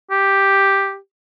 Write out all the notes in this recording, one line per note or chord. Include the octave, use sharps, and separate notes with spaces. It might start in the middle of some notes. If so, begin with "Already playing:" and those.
G4